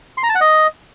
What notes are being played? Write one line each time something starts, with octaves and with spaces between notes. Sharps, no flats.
C6
A#5
A5
F#5
D#5